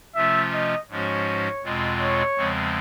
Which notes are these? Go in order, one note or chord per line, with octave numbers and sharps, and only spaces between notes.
C3 F3 A3 C#4 F4 E5
D#5
G#2 F3 G#3 C#4 F#4 C#5
E2 B2 G#3 C4 F4
C#5
E2 C#3 F3 G#3 C4